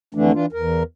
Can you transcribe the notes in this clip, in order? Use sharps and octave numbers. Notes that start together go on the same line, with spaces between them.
F2 D3 E3 A3 D4
E3 D4 F4
E2 A#4